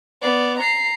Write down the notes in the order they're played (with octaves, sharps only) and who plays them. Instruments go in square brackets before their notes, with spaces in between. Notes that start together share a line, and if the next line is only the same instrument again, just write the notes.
[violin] B3 D5
A#5 C7